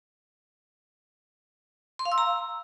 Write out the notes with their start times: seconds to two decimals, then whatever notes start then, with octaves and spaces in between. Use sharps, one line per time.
1.99 C6
2.05 F5
2.12 E6
2.18 A#5